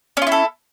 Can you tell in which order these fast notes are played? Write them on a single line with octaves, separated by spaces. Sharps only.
C#4 F4 E4 A4